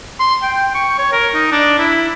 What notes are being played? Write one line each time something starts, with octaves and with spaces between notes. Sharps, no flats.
C6
G5
C#6
C#5
A#4
D#4
D4
E4